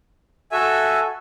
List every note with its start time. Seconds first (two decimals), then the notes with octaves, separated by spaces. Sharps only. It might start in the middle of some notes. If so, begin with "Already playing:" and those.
0.51 F#4 A4 E5 G#5